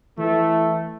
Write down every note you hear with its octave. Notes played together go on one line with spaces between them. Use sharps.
E3 A3